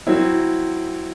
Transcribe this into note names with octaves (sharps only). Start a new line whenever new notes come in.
F#3 C4 E4